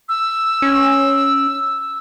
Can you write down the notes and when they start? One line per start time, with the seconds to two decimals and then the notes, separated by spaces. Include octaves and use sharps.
0.09 E6
0.62 C#4